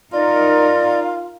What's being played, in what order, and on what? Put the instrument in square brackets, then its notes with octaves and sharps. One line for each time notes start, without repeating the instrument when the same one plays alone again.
[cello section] D#4 A#4 [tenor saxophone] F4 [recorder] D5